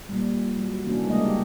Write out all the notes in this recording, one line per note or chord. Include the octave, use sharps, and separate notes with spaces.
A#2 G3
F#3
C3 E3 A#3 C#4 D4 F#4
C#3 G3 G#3 A#3 D4 D#5
G3 D#4 G4